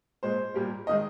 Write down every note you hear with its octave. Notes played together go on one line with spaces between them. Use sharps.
A#2 G#3 C5
A#2 G3 A#3
D#3 G#3 D#5